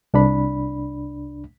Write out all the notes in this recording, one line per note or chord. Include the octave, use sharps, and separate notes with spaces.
C2 D4 B5